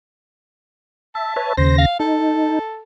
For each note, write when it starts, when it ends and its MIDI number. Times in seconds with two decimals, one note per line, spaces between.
1.15 1.34 76
1.15 1.55 81
1.36 1.53 71
1.36 1.53 73
1.36 1.53 76
1.57 1.85 39
1.57 1.85 49
1.57 1.75 72
1.57 1.85 94
1.78 1.95 77
2.00 2.59 63
2.00 2.82 69